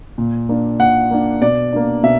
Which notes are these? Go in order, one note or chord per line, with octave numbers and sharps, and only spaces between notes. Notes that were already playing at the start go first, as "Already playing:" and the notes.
A#2
A#3 D4
A#2 F#5
A#3 D4
B2 D5
A#3 D4
B2 E5